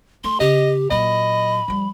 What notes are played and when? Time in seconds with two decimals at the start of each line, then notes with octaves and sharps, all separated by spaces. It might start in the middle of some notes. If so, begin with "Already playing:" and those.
0.24 A3 C6
0.40 C#3 G4 D#5
0.91 A#2 F#3 D#5 B5
1.68 F3 G3